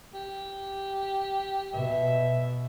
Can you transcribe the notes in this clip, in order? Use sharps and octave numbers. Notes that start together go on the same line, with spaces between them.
G4
B2 E5